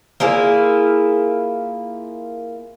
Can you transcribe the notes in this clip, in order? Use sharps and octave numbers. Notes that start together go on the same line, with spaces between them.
A#3 E4 F4 G#4